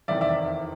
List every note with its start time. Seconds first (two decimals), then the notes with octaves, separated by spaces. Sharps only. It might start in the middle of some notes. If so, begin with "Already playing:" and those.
0.08 F1 E2 C3 D#3 D5 E5
0.21 D5 E5